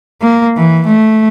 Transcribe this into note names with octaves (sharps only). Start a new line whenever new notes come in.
A#3
E3
A3